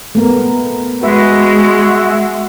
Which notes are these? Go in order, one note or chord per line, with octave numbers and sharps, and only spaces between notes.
A3 B3 A#4
G#3 F#4 B4 E5